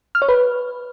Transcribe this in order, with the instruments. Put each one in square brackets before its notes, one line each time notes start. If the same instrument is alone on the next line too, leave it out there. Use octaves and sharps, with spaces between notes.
[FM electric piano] F6
C#5
B4